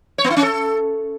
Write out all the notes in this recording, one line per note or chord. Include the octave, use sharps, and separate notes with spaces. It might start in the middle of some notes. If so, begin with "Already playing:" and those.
C#5
B3
E4
C#4
A4